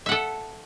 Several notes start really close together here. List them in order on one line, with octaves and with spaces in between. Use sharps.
E5 F#5 A4